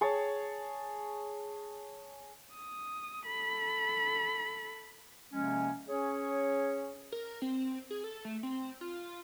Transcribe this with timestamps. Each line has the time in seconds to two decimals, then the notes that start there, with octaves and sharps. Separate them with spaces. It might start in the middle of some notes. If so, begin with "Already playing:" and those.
0.01 G#4 C#5 A5
2.55 D#6
3.26 A4 B5
5.33 C3 F3 G#3 A#3 C#4
5.89 C#4 G#4 C#5
7.12 A#4
7.42 C4
7.91 G#4
8.04 A4
8.25 A3
8.43 C4
8.81 F4